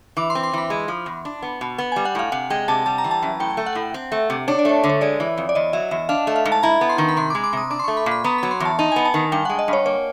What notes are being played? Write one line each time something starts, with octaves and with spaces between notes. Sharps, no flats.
E3 D6
C6
C4
C6
E3 B5
G#3
F3
E2
D4
B3
B2
B3
G3 G#5
F#5
A2 F5
C3 F#5
G#3 G5
C3 A5
G3 A5
A#5
E3
A5
F#2
A2 G5
A3
F#5
A2
C4
A3
C3
D4 C#5
D5
A3 C#5
D3
C#5
G#3 D5
E3
F2
D5
E2 D#5
F#3 E5
E2 E5
D4 F5
A3
F5
G#2
A5
E4 A#5
B3
C6
D#3
B5
C3 C6
D6
G#3
D6
C3 D#6
D4 D6
C6
A3 C#6
B5
A#2
B5
B3 A#5
F#3 B5
C6
E2 A5
D#4 A5
B3 G#5
A5
D#3
G2 G5
G#3 F#5
D#5
G2 C#5
A#3 C#5